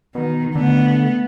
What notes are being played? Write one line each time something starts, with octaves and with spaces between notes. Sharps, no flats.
B2 D#3
D3 A3 B3